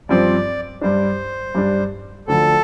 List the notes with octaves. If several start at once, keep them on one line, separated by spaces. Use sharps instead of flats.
G2 F3 C4 D5
G2 G3 D4 C5
G2 G3 D4
D2 D3 F3 A4